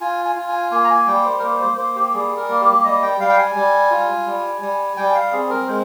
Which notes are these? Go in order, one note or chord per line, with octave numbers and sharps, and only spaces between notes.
F4 G#5
G#5
F4
G#5
A#3 G#5
A#5
G#5
G3 G5
C5
A#4
A#3 C5
C5
A#3 C5
G4
G3 G#4
A#4
A#3
G4
G3 D#5
G5
G3 F5
G5
G#5
G3
F4
G3
G3
G3 G5
F5
C4 G#4
A#4
G#3 C5